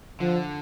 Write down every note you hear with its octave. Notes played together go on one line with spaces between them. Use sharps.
D3 F3